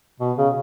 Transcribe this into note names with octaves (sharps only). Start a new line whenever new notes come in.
B2
C#3